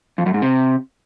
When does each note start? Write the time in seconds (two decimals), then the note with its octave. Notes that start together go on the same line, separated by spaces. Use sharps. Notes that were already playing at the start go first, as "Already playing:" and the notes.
0.18 F2
0.26 F#2
0.34 G#2
0.42 C3